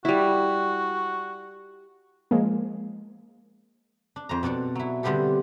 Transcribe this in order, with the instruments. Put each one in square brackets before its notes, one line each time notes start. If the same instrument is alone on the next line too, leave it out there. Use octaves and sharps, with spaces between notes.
[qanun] G3 E4 [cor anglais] F#4
[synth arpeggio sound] F3 G#3 A#3
[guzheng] D4
F2 C5 A#5
B2 D4 A4 D5
F#3 E4
D3 G3 B3 C4 G4 A4